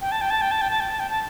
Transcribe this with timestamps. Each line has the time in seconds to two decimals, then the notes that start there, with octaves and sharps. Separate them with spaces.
0.01 G5
0.12 A5
0.21 G5
0.31 A5
0.41 G5
0.51 A5
0.61 G5
0.71 A5
0.80 G5
0.90 A5
1.00 G5
1.10 A5